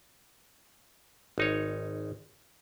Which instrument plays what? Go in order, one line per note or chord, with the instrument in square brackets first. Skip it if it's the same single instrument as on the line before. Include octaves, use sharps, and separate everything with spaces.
[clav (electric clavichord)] G#1 D#4 C#5